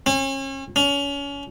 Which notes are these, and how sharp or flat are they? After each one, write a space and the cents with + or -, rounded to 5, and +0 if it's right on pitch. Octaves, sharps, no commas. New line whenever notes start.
C#4 -35
C#4 +30